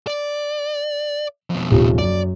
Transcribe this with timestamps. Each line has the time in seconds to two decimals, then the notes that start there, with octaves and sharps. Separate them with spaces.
0.07 D5
1.50 F2 B2
1.71 D#1 C3 F3
1.98 F#2 D5